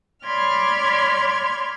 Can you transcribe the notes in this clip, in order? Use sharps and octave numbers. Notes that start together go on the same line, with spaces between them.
C#5 D5 B5 C6 F6 G#6